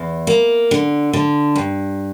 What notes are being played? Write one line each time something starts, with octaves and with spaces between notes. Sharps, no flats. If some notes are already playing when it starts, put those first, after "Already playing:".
Already playing: E2
A#3
D3
D3
G2